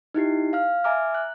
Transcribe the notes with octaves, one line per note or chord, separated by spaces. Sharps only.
D#4 E4 G4 C7
F5 F6
E5 G#5 A#5 D6 F6
F#6